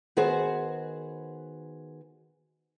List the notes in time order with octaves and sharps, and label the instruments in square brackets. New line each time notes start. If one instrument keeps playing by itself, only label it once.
[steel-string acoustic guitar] D#3 B3 F#4 G#4 C5